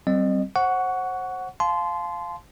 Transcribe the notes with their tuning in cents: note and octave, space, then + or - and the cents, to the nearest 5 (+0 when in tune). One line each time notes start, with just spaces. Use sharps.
G3 -35 C4 +0 D#5 -30
C5 +25 F#5 +0 C#6 +20
F5 +0 A5 -35 C6 -15